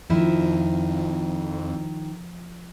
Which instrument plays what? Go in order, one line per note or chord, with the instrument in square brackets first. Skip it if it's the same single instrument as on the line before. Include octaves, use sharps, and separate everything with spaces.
[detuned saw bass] F2 [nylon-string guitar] D#3 E4 [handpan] F3